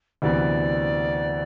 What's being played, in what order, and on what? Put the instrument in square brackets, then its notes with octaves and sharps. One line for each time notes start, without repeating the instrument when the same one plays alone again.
[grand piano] D2 C3 E3 B3 [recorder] D5